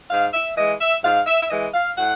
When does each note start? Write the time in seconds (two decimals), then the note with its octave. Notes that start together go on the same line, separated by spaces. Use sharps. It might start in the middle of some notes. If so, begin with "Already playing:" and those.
0.10 G#2 F5
0.33 E5
0.56 E3 G#3 D#5
0.80 E5
1.03 G#2 F5
1.27 E5
1.42 E5
1.50 E3 G#3 D#5
1.74 F5
1.97 A2 F#5